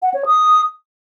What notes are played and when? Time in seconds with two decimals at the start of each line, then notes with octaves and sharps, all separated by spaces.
0.02 F#5
0.14 C#5
0.26 D#6